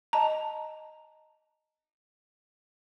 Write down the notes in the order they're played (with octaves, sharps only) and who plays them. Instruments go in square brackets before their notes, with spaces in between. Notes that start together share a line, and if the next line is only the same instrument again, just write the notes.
[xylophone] D#5 A5 A#5